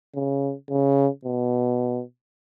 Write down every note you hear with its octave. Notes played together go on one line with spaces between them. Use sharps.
C#3
C#3
B2